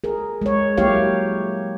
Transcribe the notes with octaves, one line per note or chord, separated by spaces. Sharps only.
G#4 A#4
G#3 C#5
F#3 A#3 E4 G4 C#5 F5